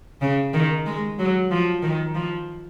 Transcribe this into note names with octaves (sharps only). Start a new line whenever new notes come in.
C#3
D#3
G#3
F#3
F3
D#3
F3